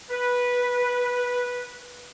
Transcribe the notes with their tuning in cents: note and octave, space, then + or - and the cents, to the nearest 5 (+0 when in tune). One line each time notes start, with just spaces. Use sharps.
B4 -10